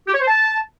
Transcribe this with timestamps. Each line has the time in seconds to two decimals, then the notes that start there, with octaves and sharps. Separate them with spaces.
0.07 G4
0.14 C#5
0.21 C5
0.27 A5